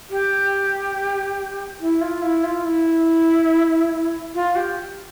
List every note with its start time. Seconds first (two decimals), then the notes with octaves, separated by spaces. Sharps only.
0.10 G4
1.80 E4
2.01 F4
2.22 E4
2.44 F4
2.65 E4
4.35 F4
4.56 G4